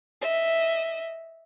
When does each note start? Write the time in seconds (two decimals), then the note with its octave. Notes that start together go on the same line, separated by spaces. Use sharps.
0.22 D#5 E5